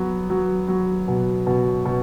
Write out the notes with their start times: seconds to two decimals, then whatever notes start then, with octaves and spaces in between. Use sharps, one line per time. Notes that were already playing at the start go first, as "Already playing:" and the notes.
Already playing: F#3 B3
0.30 F#3
0.68 F#3
1.08 B2
1.47 B2
1.85 B2